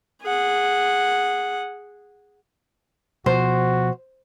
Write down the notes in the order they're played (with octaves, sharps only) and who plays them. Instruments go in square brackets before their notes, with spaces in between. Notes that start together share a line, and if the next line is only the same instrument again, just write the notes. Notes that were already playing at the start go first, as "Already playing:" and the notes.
[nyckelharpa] G#4 F#5
[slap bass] B2 F3 [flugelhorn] F#4 [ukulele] C5